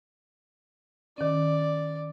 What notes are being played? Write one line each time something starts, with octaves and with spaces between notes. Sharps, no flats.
D#3 C#4 D5